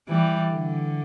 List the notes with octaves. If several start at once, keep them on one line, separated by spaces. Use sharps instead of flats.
E3 G3
D3